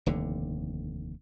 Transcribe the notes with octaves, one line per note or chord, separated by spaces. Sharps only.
F1 D#2 D3